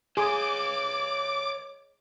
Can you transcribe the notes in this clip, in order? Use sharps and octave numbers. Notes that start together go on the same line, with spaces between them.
G#4 C#5 D#5 D6